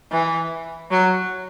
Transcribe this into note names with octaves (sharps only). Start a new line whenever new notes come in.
E3
F#3